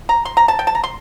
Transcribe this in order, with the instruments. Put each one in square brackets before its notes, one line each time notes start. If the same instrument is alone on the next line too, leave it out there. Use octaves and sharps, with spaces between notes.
[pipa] A#5
C6
A#5
A5
G5
A5
A#5
C6